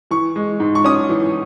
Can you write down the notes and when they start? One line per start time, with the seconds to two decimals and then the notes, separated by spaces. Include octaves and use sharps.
0.11 E3 C#6
0.36 G#3
0.60 G#2
0.75 C#6
0.84 C#4 D#6
1.09 E3